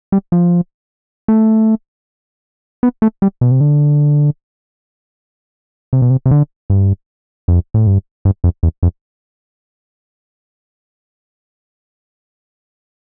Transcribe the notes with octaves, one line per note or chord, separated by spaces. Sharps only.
G3
F3
A3
B3
A3
G3
B2
C3
D3
C3
B2
C3
C3
D3
G2
F2
A2
G2
G2
F2
E2
F2